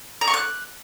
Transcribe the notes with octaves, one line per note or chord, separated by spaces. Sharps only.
A#5
C#6
F#6